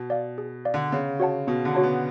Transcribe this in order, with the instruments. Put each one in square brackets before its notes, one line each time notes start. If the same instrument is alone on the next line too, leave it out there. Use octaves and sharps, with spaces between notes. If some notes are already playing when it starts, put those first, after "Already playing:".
Already playing: [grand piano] B2
[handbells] D5 F5
G#4
D5 F5
[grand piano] D3
[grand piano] C#3 [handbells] B3
[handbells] F#4 C#5 F#5 A5
[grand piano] B2 [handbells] B3
[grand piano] D3
[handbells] F#4 C#5 F#5 A5
[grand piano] B3